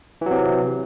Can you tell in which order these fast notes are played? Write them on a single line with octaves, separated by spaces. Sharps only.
E3 F#3 C3